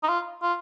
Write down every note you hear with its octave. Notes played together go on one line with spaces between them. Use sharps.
D#4
F4
F4